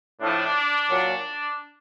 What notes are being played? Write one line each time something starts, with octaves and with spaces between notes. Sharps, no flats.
A2 F3 D4
A#2 F#3